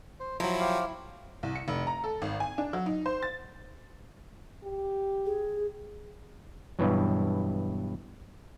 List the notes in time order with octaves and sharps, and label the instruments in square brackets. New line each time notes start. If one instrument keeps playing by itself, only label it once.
[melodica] C5
[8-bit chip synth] F3 F#3 [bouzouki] E4 [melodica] C5 A#5
[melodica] G4 C5 F5
[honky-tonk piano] C2
C#7
F1
A#5
A4
G#1
G#5
D4
F#3
D#4
C5
A6
[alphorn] G4
[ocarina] G#4
[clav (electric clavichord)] G2 B2 E3 F#3